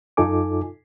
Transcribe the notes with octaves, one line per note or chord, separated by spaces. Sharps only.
F#2 D#4 F4 A4 G#5 D6